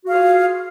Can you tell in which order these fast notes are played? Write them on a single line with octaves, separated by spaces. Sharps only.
F#4 F5 G#4 F4